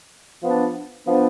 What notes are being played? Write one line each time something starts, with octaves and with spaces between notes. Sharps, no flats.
F3 B3 D4
F3 B3 D4